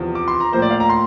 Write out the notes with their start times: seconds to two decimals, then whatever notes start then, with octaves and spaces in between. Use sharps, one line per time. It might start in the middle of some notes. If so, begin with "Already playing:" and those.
Already playing: E2 C3 F3
0.15 D6
0.28 C6
0.40 A#5
0.52 A2 F3 A#3 C5
0.62 D5
0.70 F5
0.80 A#5
0.90 C6